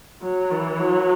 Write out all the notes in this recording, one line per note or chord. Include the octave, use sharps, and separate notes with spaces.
F#3
E3
F#3